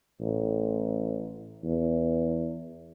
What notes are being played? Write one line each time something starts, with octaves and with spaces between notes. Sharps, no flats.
A1
E2